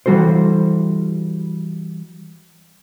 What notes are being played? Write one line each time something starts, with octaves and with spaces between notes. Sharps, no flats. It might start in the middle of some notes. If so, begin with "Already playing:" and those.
E3 G3 F#4 A4 C5